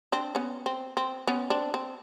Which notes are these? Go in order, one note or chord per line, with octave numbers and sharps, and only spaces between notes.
C4 D4
B3 C#4
C4
C4
B3 C#4
C4 D4
C4